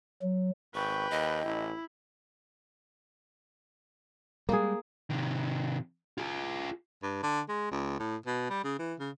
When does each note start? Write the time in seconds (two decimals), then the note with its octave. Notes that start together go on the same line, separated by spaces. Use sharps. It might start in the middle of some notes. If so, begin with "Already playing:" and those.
0.22 F#3
0.75 G#1 B4 G5 C#6
1.11 D#2 D#5
1.45 A1 E4
4.49 G3 G#3 A#3 G#4
5.10 C3 D#3
6.18 F4 G#4
7.03 G2
7.23 D3
7.48 G#3
7.71 C#2
8.00 A2
8.26 B2
8.50 G3
8.64 C#3
8.79 E3
9.00 C#3